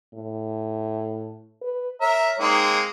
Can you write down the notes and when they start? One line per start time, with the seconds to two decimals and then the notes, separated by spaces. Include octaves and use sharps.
0.14 A2
1.62 B4
2.01 A#4 C#5 E5
2.40 G#3 A#3 C4 D#4